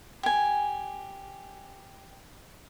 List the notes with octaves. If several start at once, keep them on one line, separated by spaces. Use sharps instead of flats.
G4 G#5